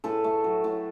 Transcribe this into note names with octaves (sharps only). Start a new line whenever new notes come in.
A2 A4 B4
A3
F#3
A2